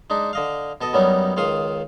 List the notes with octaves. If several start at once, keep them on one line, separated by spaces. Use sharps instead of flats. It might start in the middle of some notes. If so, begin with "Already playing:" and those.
G#3 D4 D#4
D3 D#5 F5
B2 A4 D#5
F#2 F#3 G3 B3 C#4 D#4
C#2 D#3 F5 C6 D#6